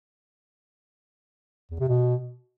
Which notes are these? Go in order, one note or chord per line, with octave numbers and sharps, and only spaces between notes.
E2
C3
B2